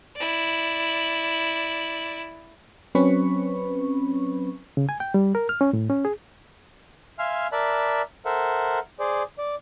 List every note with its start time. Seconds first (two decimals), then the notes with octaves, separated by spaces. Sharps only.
0.16 E4 D5
2.95 F#3 C4 C#4 B4 B5 C#6
4.77 C#3
4.89 G#5
5.00 G5
5.14 G3
5.35 A#4
5.49 F6
5.61 C#4
5.73 A2
5.90 C#4
6.05 G#4
7.19 E5 F5 G#5 C6 F6
7.52 A#4 D5 E5 A5 B5 F#6
8.25 A4 A#4 C5 E5 F#5
8.99 G#4 C5 D5
9.38 D5